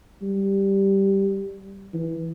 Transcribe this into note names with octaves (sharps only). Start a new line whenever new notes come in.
G3
E3